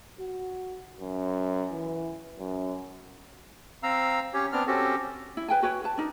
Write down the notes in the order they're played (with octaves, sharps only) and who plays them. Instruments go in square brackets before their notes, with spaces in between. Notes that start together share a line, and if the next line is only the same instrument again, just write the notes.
[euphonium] F#4
F#2
E3
F#2
[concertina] C4 F5 A#5 E6
C#4 G4 C#5
B3 C4 D4 F6
C4 C#4 F#4 G4 A4
[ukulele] E4
B4 G5 G#5
F#4 B4 C#5 G5
B4 A5
D4 D#4 A#4